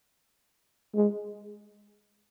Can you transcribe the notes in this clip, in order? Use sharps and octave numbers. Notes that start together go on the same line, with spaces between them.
G#3